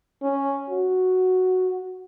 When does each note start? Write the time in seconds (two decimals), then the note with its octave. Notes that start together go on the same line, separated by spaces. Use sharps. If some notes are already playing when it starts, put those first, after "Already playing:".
0.23 C#4
0.70 F#4